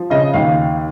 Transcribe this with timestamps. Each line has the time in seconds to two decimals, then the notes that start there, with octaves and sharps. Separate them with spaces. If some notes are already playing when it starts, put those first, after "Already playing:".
Already playing: F3
0.10 C#3 D#5
0.34 D#2 F5